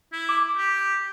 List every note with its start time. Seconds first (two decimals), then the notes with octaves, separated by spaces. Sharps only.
0.12 E4
0.29 D6
0.57 G4